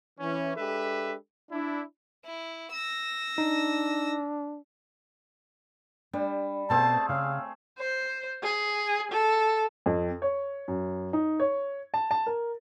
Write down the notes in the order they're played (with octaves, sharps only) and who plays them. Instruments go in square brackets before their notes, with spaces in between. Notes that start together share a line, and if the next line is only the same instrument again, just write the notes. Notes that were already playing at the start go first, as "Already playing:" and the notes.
[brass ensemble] E3 C#4
G#3 D4 G4 A4 B4 E5
D4 E4
[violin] E4
E6 A#6
[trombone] D4 [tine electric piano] D#4
[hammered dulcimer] G3 [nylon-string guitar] D4
[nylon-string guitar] B2 F5 [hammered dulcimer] A3 C4 G#4 [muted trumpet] A5
[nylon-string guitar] C#3 [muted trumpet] F5
[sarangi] C5
G#4
A4
[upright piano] F2
C#5
F#2
D#4
C#5
A5
A5
A#4